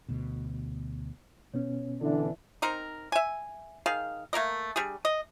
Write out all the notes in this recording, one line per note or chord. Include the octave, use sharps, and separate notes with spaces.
D2 B2
B2 B3 C#4 C#5
D3 E3 D4 E4 E5
C4 D#4 A#4
E5 G#5
D#3 G#4 F5
A3 A#3 A#4 D#5
G3 D4 G#4
D#5